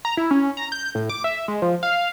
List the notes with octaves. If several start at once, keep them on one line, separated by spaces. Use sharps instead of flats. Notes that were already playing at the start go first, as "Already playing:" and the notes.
A#5
E4
C#4
A#5
G6
A2
D6
E5
G#3
F3
F5